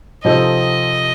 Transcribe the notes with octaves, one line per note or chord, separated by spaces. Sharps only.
C3 F3 C4 D#4 A4 D#5